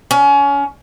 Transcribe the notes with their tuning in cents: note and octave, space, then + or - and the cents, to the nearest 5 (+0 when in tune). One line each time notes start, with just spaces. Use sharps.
C#4 +25